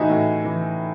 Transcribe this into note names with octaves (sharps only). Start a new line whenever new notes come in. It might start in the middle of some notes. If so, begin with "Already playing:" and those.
Already playing: A2 E3 D#4 F#4 G#4 E5
A2
E3